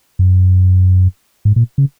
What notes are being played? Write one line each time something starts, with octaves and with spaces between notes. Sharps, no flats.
F#2
G#2
A#2
C#3